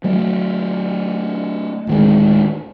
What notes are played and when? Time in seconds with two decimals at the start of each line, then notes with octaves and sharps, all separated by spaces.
0.04 F#3 A3
1.87 D1 D#3 G#3